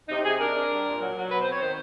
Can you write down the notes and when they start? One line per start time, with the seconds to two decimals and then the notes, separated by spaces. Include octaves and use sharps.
0.09 C3 D#4
0.24 C3 G#4
0.39 D4 A#4
0.55 D4
0.70 G3
0.86 A#2
1.00 F#3
1.16 F#3
1.30 B2 B4
1.41 C5
1.46 C4
1.51 C#5
1.61 D#3 C5